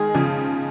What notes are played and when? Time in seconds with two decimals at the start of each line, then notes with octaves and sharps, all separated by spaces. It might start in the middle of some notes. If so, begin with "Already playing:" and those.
Already playing: D#3 G#3 G#4
0.14 C#3 F3